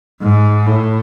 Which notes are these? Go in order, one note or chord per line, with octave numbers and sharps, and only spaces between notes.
G#2
A2